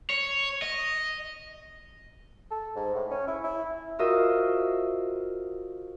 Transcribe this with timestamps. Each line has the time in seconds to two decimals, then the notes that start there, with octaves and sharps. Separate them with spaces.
0.10 C#5
0.62 D#5
2.51 A4
2.76 G#2
2.95 A2
3.10 C#4
3.27 E4
3.44 E4
3.99 F4 F#4 A#4 C5 D#5 E5